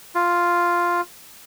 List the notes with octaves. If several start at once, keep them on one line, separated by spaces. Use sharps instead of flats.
F4